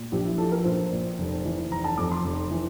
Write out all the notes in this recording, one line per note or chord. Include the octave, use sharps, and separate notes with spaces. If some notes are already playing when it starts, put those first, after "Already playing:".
Already playing: A#2
A#1 G4
E4
F3 A4
A#4
A#1 C5
A#2
F1
E3
F1 A#5
A5
F2 D6
C6
F1
E3